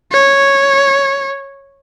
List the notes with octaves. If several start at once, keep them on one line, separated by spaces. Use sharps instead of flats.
C#5